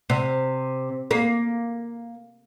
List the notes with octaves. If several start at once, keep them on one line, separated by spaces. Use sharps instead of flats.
C3
A#3